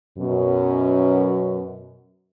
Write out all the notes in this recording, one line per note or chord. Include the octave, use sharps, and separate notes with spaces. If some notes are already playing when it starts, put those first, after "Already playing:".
F#2 B2